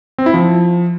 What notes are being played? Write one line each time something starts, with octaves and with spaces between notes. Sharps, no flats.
C4
E4
F3